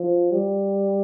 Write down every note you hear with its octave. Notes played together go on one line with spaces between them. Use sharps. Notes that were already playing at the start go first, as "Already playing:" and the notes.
Already playing: F3
G3